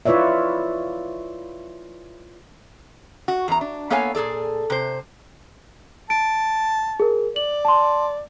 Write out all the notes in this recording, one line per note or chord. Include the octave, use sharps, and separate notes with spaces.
E4 F4 B4 C#5 D5 E5
F#4
E2 D4 A#5
D4
A#3 B3 A4 C#5 F5 G#5
A#2 G#4 A4 D5
C3 C5
A5 D7
G#4 A#4
D5 F#7
A5 C6